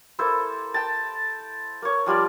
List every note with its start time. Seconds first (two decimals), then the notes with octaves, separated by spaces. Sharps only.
0.19 A#3 E4 A4 C5
0.74 G5 A5
1.82 A#3 C#5
2.06 F3 G3 F4 D5